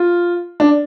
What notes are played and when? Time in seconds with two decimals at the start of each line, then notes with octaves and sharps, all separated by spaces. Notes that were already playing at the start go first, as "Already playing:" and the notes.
Already playing: F4
0.60 D4